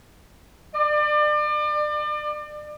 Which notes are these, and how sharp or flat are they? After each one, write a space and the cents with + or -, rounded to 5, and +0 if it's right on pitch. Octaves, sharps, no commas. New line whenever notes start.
D5 +35